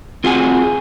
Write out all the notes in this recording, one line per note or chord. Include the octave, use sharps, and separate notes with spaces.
C4 F4 F#4 G#4 G#5